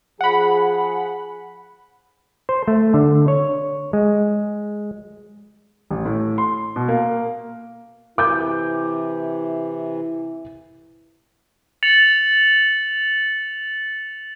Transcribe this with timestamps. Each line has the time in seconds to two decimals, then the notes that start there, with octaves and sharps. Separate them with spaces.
0.21 F3 G#4 F#5 B5
2.49 C5
2.68 A3
2.94 D3
3.28 C#5
3.93 G#3
5.91 A1
6.05 A2
6.38 C6
6.76 B2
6.88 A#3
8.18 C3 E3 E4 D6 G6
11.83 A6 C#7 F7 F#7